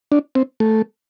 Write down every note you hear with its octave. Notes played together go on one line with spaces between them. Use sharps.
D4
C4
A3